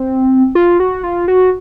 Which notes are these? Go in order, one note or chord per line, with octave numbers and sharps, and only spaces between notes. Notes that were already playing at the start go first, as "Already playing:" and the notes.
Already playing: C4
F4
F#4
F4
F#4